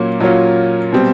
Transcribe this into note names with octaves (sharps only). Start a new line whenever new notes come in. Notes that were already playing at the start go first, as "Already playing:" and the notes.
Already playing: A#2 F#3 A#3 C#4
A#2 F#3 A#3 C#4 F4
B2 G3 C4